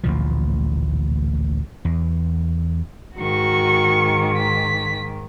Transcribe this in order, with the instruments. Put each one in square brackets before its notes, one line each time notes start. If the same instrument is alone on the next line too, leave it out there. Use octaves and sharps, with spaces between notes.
[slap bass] A1 D2 A#2 F3
E2
[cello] G#2 D#3 [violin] F#4 C#6
[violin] B6